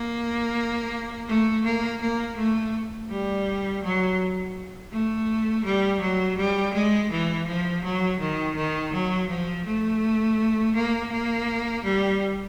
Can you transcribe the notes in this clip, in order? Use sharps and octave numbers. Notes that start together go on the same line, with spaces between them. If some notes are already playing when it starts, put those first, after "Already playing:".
Already playing: A#3
A3
A#3
A#3
A3
G3
F#3
A3
G3
F#3
G3
G#3
E3
F3
F#3
D#3
D#3
F#3
F3
A3
A#3
A#3
G3